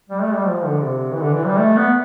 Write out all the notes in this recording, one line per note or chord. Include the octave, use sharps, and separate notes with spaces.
G3
A3
G3
F3
D3
C3
E3
D3
E3
G3
A3
B3